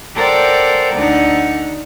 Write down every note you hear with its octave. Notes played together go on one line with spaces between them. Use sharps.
A4 A#4 C5 D5 F#5 G5
D2 D3 D#4 F#5